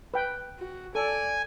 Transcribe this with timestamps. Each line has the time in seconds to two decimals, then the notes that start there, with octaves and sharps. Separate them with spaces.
0.14 B4 G5
0.59 F#4
0.95 A4 D5 G#5